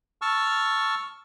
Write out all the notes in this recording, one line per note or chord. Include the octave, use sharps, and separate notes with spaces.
A5 C#6 E6 F6